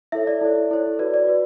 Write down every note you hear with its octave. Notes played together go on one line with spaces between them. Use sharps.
E4 A4 C#5 E5
D5
E4 A4 C#5
E4 A4 C#5
F#4 B4 D5
D5
F#4 B4